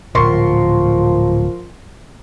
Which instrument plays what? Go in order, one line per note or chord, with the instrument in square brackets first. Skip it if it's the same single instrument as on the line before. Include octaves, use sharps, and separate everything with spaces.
[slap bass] D1 A#2 [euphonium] F3 [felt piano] A#4 C6 C#6